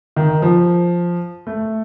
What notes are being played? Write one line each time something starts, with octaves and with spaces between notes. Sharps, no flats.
D#3
F3
A3